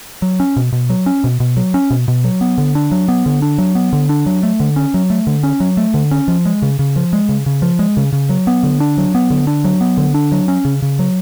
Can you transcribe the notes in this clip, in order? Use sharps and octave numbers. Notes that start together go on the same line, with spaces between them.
F#3
C#4
B2
B2
F#3
C#4
B2
B2
F#3
C#4
B2
B2
F#3
B3
D3
D4
F#3
B3
D3
D4
F#3
B3
D3
D4
F#3
A3
D3
C#4
F#3
A3
D3
C#4
F#3
A3
D3
C#4
F3
G#3
C#3
C#3
F3
G#3
C#3
C#3
F3
G#3
C#3
C#3
F#3
B3
D3
D4
F#3
B3
D3
D4
F#3
B3
D3
D4
F#3
C#4
C#3
C#3
F#3